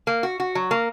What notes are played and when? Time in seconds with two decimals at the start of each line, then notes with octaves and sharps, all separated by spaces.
0.07 A#3
0.23 F#4
0.40 F#4
0.55 F#3
0.71 A#3